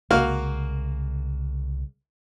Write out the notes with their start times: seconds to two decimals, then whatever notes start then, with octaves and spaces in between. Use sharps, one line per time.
0.11 C2 C#3 G#3 A#3 F#4 F5